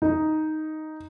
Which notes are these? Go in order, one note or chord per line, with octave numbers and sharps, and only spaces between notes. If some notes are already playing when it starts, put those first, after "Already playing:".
D#4